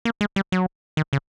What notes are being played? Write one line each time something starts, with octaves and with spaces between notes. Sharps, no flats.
A#3
G#3
G3
F#3
D#3
C#3